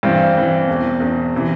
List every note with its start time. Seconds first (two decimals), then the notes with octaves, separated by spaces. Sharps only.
0.03 G2 E3 C4
0.36 G2 E3
0.67 E2 B2
1.00 E2 B2
1.35 C3 E3